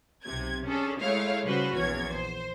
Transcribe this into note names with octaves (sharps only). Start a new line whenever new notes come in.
B1 C3 G#6
C#4 D4 G#4 A4
G#3 A3 E4 C#5 F5
C#3 G3 C#4 F#4 B4 C5
A#1 E2 C#5 G#6
C5